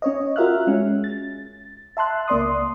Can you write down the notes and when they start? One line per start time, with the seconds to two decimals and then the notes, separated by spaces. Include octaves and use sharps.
0.02 C#4 C#5 D#5
0.36 F4 F#4 A#4 E5 F6 F#6
0.67 G#3 C#4
1.04 A6
1.97 E5 A5 C6 F#6
2.28 C#2 A#3 D5 C6 D#6